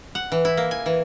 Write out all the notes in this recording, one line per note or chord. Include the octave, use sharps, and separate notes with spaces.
F#5
E3
E4
A#3
G#5
E3